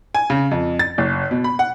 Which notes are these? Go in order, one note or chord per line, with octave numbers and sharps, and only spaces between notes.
G#5
C#3
F2
A6
F#1
B2
B5
F#5